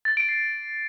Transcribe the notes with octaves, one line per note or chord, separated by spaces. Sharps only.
A6
D7
C7